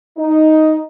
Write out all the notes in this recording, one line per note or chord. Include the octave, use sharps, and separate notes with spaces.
D#4